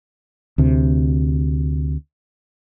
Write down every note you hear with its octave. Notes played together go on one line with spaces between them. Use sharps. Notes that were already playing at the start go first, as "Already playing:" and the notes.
D2 C3